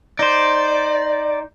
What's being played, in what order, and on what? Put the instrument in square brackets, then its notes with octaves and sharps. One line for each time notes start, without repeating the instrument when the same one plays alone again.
[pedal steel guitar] D#4 C5 [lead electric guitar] D5